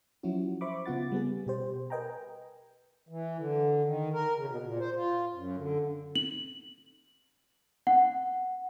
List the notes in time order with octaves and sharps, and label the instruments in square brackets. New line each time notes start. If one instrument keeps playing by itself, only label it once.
[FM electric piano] F3 F#3 C#4 E4 F#4
C5 E5 B5 C#6 D6
C#3 B3 F4 F#5 A6
G3 B3 G#4
B2 G4 C5
A#4 B4 D#5 G5 G#5 A#5
[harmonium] E3
D3
D#3
A#4
C#3
B2
A#2
C5
F4
F#2
D3
[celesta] F#7
F#5